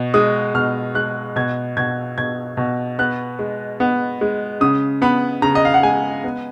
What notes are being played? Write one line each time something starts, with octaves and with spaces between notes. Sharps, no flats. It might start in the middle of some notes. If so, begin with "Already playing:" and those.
Already playing: B2
G#3 D#6
B2 F6
G#3 F#6
B2 G#6
B2 G#6
B2 G#6
B2
B3 F#6
G#3
B3
G#3
C#3 D#6
B3 B5
C#3 A#5
D#5
F5
F#5
G#3 G#5
B3